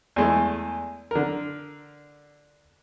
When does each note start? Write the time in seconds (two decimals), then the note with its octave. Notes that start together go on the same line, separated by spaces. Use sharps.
0.16 E2 G#3 A3
1.11 D3 A#4